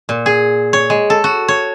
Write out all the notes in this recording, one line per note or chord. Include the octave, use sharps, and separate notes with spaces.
A#2
G#4
C#5
G#3
A4
F#4
C#5